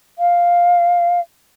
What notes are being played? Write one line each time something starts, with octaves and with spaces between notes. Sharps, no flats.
F5